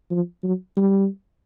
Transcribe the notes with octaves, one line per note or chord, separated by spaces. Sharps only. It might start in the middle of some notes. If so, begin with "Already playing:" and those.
F3
F#3
G3